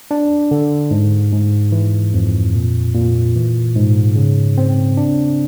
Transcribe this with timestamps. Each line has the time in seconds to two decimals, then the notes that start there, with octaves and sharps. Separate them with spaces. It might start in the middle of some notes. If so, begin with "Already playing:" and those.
0.11 D4
0.51 D3
0.91 G#2
1.32 G#2
1.72 E3
2.13 F2
2.54 A#2
2.94 A#2
3.35 E3
3.76 G#2
4.16 C#3
4.58 C4
4.97 D4